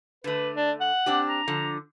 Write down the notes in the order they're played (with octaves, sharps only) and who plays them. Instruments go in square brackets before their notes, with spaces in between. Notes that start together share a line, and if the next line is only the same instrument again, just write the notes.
[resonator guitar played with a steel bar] D3 A3 [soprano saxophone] B4
[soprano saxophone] D4
F#5
[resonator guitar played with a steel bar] C4 D4 G4
[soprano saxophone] A#5
[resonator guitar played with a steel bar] D3 F3